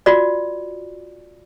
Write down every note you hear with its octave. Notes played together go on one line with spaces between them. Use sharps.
F4 F#4 D5